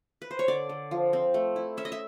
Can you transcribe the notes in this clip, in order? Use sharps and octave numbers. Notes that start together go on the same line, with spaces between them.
B4
C5
C#5
D3 D5
D3
F3
C4
A3
E4
C#4 E5
D#5
E5